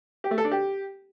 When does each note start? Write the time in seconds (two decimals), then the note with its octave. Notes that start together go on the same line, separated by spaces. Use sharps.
0.24 G4
0.31 A3
0.38 A4
0.45 D4
0.51 G4